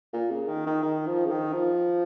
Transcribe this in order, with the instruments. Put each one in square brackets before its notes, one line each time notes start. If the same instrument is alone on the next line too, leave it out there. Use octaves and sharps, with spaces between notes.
[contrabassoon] A#2
C#3
D#3
D#3
D#3
F3
C#3
D#3
F3